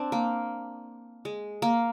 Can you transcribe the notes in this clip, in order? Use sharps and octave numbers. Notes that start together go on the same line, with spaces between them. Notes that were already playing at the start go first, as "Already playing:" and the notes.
Already playing: C4 D4
A#3
G#3
A#3